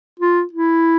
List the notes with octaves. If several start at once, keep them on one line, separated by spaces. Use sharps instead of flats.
F4
E4